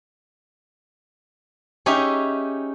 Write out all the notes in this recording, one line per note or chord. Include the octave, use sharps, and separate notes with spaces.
C#4 D#4 G4 G#4 E5